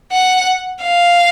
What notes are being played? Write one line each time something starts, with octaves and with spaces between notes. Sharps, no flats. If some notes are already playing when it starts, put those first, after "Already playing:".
F#5
F5